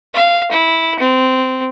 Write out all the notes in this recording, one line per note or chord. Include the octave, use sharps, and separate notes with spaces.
F5
E4
C4